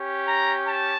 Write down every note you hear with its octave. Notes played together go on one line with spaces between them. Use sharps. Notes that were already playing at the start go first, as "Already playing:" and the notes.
Already playing: C#4 G4
A#5
A5